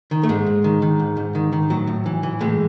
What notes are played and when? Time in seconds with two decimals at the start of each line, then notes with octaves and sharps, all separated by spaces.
0.11 D#3
0.23 A3
0.29 G#2 G#3
0.46 G#2
0.64 D#3
0.82 D#3
1.00 G#2
1.17 G#2
1.35 D#3
1.52 D#3
1.70 A2 F#3
1.87 A2
2.06 E3
2.23 E3
2.41 A2 G#3